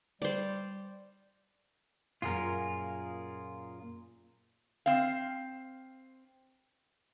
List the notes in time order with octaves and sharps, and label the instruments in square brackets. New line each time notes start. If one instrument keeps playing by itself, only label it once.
[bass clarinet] G3 [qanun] C5 D5
[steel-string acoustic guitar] F#2 A#2 [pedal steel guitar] F4 G#4 A#4
[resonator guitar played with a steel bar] C4 F5